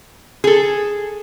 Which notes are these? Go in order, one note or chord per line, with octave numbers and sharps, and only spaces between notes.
G#4 A4